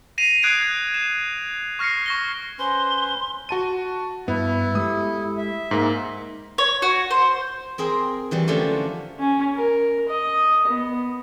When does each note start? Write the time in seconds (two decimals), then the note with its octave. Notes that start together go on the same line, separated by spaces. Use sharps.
0.18 A#6 C7 D#7 F7
0.42 D#6 F#6 G#6 C7 D7 D#7
0.94 E7
1.79 C#6 F6 A#6 C7 C#7
2.06 C#6 A#6 G7
2.59 C#4 B4 C5 C6
3.49 F#4 A5 D#7
4.28 G2 B3 E4
4.75 G#3 G4 A4 D#6
5.38 E5
5.71 G#2 A#3
6.58 C#5
6.82 F#4
7.11 C5
7.78 C4 G#4 A#4 C6
8.31 E3 F#3 G3
8.47 D3 F3 F#3 A3 C#4 D4
9.19 C#4
9.56 A#4
10.09 D#5
10.67 B3